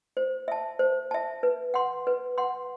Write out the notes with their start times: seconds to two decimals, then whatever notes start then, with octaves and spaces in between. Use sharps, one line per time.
0.17 C5
0.48 E5 A5
0.79 C5
1.11 E5 A5
1.43 B4
1.74 F#5 C6
2.07 B4
2.38 F#5 C6